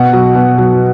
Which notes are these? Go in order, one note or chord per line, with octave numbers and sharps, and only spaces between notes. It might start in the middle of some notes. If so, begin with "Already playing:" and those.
Already playing: B2 F#5
F#3
B2
F#3